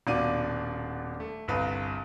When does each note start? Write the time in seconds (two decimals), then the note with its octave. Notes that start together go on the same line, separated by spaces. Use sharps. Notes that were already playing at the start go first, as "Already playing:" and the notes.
0.07 D#1 B2 D4 D5 F5 D#7
1.20 A3
1.48 G1 C2 B4 F5